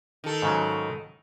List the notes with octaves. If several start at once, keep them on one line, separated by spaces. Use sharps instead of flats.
D#3 A4
G#2 C#3 F#3